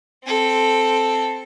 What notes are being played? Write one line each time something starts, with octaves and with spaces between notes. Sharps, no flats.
C4 A4